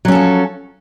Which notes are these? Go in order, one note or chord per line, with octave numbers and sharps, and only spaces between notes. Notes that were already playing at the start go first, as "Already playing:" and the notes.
F3 F#3 C#4 A4